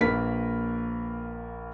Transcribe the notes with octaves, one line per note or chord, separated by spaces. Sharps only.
A#1 A#3 A#4 B4 B6